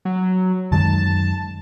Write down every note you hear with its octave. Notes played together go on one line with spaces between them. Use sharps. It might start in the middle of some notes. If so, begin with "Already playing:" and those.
F#3
F#2 D#3 G#3 A5